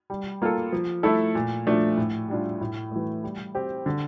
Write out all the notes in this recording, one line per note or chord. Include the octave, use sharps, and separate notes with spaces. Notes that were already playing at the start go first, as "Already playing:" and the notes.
G3
A#3 F4 A4
F3
A3 E4 A4
A#2
F3 A3 D4
A2
G3 D4 F4
A2
E3 A3
G3
C4 G4
D3